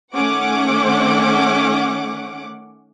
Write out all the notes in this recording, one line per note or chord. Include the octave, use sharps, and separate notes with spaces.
D#3 A3 C#4 F#5 D6